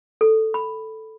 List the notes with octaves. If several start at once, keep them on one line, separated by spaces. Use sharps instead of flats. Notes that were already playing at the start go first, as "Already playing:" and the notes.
A4
B5